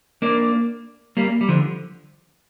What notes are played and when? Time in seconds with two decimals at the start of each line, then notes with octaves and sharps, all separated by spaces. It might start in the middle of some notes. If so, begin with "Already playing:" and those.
0.22 A#3 D4
1.17 G3 A#3
1.41 G3
1.48 D3 F3